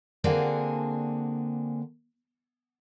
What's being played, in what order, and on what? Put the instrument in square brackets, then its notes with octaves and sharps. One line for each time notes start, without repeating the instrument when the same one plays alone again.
[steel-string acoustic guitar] D3 A#3 C4 D4 F#4 G#4